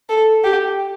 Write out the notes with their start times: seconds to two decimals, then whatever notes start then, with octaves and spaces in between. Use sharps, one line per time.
0.09 A4
0.44 G4